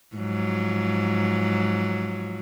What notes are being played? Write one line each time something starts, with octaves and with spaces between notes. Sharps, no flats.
G#2 F3 F#3